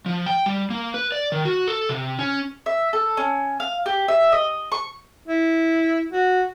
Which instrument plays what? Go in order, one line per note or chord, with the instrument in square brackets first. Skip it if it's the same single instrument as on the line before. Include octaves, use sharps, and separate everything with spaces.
[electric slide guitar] F3
G5
G3
A#3
B4
D5
D#3
F#4
A4
C3
C#4
[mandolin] E5
A4
C#4
F5
G4
E5
D#5
C#6
[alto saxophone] E4
F#4